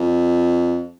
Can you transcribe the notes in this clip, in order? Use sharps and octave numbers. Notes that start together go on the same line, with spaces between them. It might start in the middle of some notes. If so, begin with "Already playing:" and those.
Already playing: F2